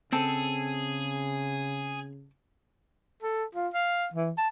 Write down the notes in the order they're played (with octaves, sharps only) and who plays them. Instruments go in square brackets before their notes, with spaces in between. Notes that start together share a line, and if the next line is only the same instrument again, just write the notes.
[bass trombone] C#3 [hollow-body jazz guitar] C4 [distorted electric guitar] G#4 [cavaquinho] A4
[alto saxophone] A4
F4
F5
E3
A5